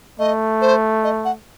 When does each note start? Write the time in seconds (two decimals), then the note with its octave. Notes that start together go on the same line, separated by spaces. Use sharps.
0.19 A3 D#5
0.61 C5
1.04 D#5
1.25 F#5